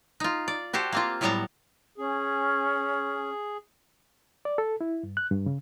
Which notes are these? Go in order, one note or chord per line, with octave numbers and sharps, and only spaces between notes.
D#4 F4
D5
F#4 G4 A4 C5
A#3 C4 F4
A2 F#3 G3 B3 A5 A#5
C#4 G#4
D5
A4
E4
G2
F#6
G2
C#3